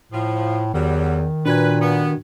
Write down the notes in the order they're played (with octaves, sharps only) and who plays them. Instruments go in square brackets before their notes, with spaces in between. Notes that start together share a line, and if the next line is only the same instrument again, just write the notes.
[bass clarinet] A2 [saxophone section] F3
[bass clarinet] E2 [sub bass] D#3 [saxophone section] F#3 G3
[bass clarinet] A#2 [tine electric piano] D4 F#4 G#6 [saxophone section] B4
[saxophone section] G2 B3